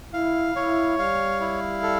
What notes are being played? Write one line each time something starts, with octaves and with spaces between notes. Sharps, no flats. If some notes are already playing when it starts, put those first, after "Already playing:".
E4 F5
E4 C#5
G3 F5
E4
A4